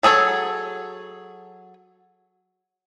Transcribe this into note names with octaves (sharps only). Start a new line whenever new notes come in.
F#3 G#4 A4 C#5